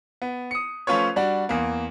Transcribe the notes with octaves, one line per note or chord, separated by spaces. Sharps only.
B3
D#6 C#7
F3 A3 C#4 F4 B4 C#5
G3 D4 F#4
E2 A#3